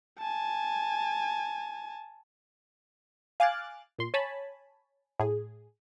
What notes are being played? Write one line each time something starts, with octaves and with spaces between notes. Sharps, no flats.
G#5 A5
F5 G#5 D6 F6 F#6 A6
A#2 C6
C#5 G#5 A5 B5
A2 G#4